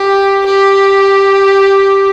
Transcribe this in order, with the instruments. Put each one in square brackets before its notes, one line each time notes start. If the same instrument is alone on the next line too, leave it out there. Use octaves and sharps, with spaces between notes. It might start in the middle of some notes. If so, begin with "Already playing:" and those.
Already playing: [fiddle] G4
G4